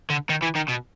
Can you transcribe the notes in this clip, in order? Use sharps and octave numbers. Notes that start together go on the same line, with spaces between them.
D3
D#3
E3
D#3
B2